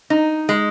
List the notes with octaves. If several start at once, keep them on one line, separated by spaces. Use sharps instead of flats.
D#4
G#3